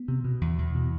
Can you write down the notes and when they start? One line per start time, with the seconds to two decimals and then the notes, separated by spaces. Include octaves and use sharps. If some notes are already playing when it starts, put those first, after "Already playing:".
Already playing: B3
0.08 C3
0.24 B2
0.41 E2
0.59 E2
0.75 B2